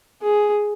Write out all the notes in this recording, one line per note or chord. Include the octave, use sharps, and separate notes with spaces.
G#4